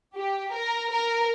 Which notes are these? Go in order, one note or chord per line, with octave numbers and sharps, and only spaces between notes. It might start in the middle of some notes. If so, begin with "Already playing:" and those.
G4
A#4
A#4